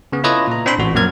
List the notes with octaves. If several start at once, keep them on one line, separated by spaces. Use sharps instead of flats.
C#3 B3
E4 F4 A4 B4 C#5 D#5
A#2 A#5
C4 D4 G5 B5 C6
A1 F#4
F#2 A#2 F3 A#3 F6 G#6